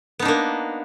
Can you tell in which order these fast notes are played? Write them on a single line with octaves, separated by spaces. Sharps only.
B3 D#4 D4 A#3